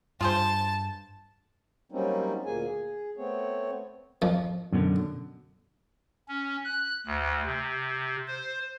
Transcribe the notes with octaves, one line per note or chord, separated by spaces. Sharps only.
G2 F4 G#4 C5 A5
F#3 G3 A#3 C4 C#4 D#4
D2 A#2 A#3 G#4 G#5
G#4
A3 B3 C4 C#5
F2 F3
F#2 B2 D3
C#4
F#6
D2
C3
C5